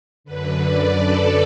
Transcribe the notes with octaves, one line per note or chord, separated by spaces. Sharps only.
F#2 D3 B4
D5
A4